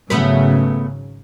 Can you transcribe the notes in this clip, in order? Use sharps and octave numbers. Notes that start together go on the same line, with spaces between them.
G#1 C#3 F#3 A3 B3 B4